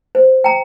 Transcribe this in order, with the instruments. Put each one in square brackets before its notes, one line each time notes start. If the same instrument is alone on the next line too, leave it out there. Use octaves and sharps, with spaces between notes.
[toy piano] C5
G5 A#5